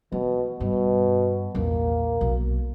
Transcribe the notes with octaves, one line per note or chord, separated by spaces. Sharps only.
B2 E3
G2 B2
A#1 E2 A#3
B1